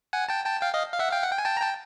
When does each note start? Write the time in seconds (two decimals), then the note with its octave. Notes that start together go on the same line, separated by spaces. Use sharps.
0.13 F#5 G#5
0.28 G5 A5
0.45 G5 A5
0.62 F5 G5
0.74 D#5 F5
0.93 F5
0.99 E5 F#5
1.11 F5 G5
1.23 F#5
1.31 G5
1.38 G#5
1.45 G5 A5
1.57 A#5
1.61 G5 A5